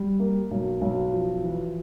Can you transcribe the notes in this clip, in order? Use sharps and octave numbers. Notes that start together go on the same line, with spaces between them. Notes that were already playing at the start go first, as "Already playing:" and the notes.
Already playing: G3
A#3
B1
B1
F3
E3